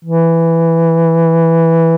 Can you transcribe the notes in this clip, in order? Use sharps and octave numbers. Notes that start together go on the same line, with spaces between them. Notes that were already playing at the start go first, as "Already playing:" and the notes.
E3